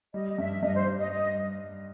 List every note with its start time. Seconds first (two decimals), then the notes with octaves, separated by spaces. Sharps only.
0.14 G3 D#5
0.29 D#5
0.38 G2 E5
0.62 G2 D#5
0.74 C5
0.87 G3
0.98 D#5
1.10 D#5